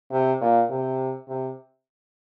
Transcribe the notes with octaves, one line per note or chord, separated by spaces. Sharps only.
C3
A#2
C3
C3